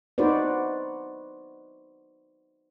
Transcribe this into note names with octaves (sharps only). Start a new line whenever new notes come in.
D#4 F#4 B4 C5 D5